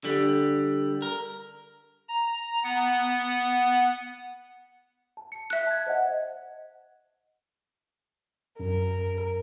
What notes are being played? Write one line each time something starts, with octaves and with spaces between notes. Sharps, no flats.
D3 G3
A#4
A#5
B3 F#5
A5
C#7
E5 F#6
A5 G#6
C5 D#5 F#5
F#2 A#4